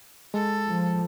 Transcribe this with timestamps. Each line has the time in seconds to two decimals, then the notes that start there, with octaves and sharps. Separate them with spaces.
0.34 G#3 A4
0.70 F3